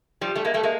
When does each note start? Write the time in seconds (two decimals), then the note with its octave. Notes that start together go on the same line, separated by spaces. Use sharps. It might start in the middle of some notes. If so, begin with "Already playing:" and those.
0.21 F3 G3
0.35 G3 A3
0.45 G#3 A#3
0.54 G3 A3
0.63 G#3 A#3